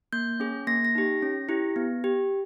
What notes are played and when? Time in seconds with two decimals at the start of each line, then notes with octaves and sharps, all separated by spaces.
0.13 A#3 G6
0.40 C#4 G#4
0.67 A#3 A#6
0.85 A#6
0.95 D#4 G4
1.22 C#4
1.49 E4 G4
1.76 B3
2.04 G4